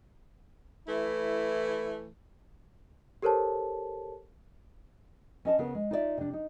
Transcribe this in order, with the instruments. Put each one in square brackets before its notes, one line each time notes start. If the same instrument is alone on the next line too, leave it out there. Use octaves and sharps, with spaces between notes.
[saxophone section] E3 A3 E4
[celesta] G4 A4 A#4 C5 C#5 A5
[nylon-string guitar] C#4 D#5 A5
C#3 B3 G#4 A#4
G#3
D#4 F4 G#4 C5 D5 E5
C3 D4
D#4